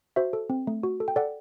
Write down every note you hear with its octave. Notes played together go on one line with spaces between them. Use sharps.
F#4 C5 E5
A4
C4
A3
F#4
A4
G5
A4 D5 F#5